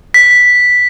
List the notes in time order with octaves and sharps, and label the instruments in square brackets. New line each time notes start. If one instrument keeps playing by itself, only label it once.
[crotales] B6